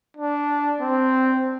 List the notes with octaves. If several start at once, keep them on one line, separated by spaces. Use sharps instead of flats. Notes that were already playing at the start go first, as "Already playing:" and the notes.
D4
C4